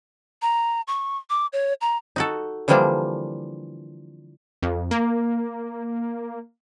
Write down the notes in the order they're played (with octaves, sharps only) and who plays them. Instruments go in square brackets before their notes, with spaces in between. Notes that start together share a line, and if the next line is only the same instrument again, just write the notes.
[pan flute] A#5
C#6
D6
C#5
A#5
[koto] D#4 F#4 A4
D3 E3 F3 G3 A#3 D4
[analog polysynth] F2
A#3